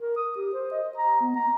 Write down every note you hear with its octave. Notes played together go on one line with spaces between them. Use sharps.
A#4
D#6
G4
C5
D#5
A#5
B3
A#5